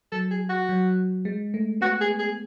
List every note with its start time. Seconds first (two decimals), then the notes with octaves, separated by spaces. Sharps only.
0.12 F#3 A4
0.31 G#4
0.49 F#4
0.69 F#3
1.25 G#3
1.54 A3
1.81 B3 F#4
2.01 G#4
2.19 G#4